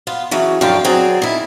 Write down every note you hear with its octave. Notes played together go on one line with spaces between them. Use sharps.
B3 F4
C#3 E3 F#3
F#2 D3 F3 F5 G5
F#3 C4 G#4 D5
D#3 E4